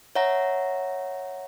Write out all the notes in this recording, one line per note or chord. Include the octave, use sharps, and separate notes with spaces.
C#5 E5 F#5 A#5 A#6